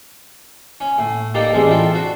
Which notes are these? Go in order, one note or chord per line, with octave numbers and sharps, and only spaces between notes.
C#4
A2
A#3 D#4 G4 A4 D5 F5
A1 A2 G3 G#3 C4
C4 E4 F4 A4
C4 D4 F#4